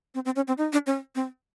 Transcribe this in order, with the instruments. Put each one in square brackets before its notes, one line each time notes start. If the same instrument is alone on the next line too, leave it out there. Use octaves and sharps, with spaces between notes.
[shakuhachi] C4
C4
C#4
C4
D#4
D4
C#4
C4